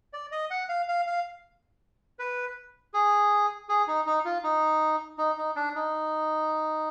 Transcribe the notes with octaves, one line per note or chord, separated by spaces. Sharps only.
D5
D#5
F#5
F5
F5
F5
B4
G#4
G#4
D#4
D#4
F4
D#4
D#4
D#4
D4
D#4